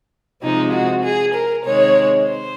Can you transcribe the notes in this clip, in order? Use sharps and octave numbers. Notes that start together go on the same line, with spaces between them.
C3 F3 G#3 D#4
F#4
G#4
A#4
C3 D#3 G#3 C#5
C5